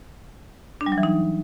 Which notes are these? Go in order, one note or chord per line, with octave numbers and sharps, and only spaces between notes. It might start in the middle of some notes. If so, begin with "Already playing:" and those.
D4
G3
F#3
E3
D#4